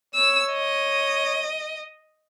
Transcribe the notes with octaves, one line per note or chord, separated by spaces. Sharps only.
C#5 E6
D#5